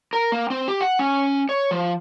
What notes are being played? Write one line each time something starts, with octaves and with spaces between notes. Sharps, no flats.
A#4
A#3
C4
G4
F#5
C#4
C#5
F3